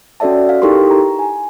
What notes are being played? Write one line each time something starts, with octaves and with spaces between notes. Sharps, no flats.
C#4 F#4 A4 D5 E5 A5
F5
D#4 E4 G4 A4 A#4 C6
A#5
G#5